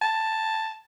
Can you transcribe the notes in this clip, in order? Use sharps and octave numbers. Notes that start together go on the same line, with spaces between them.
A5